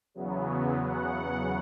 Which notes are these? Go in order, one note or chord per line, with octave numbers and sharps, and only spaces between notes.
E2 C#3 F#3 B3
F#5